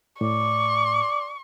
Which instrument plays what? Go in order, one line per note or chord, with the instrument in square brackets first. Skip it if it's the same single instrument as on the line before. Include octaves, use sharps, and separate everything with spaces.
[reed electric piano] A2 [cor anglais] D5 [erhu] C#6